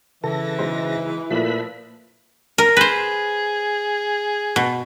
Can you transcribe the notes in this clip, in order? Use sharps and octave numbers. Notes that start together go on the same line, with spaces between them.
C#3 E3 A4 A#6
B1 G#3 C5
A#2 F3 A3 E4 B4 E5 B5
A#4
G#4 B4 C5
B2